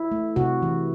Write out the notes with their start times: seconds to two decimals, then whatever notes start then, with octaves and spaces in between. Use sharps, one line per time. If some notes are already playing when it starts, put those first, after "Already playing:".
Already playing: E4
0.12 A3
0.36 C3 F#4
0.62 E3